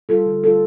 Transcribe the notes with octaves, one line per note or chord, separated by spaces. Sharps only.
G3 F4 A4
D3
G3 F4 A4